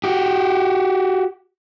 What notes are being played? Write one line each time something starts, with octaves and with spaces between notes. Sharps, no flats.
F#4 G4